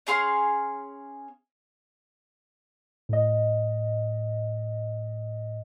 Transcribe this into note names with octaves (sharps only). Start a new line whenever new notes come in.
C#4 G#4 F5 C6
A2 D#5